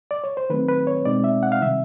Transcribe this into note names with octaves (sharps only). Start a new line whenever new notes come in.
D5
C#5
C5
D#3 F#3 A3 C4 B4
B4
C#5
B2 G#3 C4 D#4 D5
E5
F#5
F5
C3 D#3 G3 E5